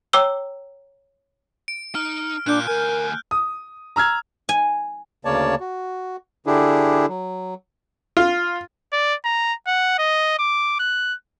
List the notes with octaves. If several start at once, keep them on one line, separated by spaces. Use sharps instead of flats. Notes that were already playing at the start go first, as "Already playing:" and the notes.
C#5 G5 A#5 D6 E6 G7
D7
D#4 F6
A#2 D4 F#6 G6
D2 A#4 G#5
D#6
A#5 E6 F6 G#6
G#5
D2 C#3 A#3 C#5 D5 A5
F#4
D3 D4 E4 G4 G#4
F#3
F4
D5
A#5
F#5
D#5
D6
F#6